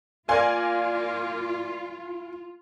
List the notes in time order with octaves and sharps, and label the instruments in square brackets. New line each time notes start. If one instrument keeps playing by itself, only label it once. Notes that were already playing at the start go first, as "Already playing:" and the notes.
[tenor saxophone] A#3 [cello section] F4 [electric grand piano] A#4 D5 F5 [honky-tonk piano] G#5 C6